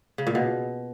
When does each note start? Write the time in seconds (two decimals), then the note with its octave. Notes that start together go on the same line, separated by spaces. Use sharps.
0.18 C#3
0.27 A#2
0.35 B2